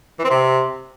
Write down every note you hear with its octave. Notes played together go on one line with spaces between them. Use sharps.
E3
C4
C3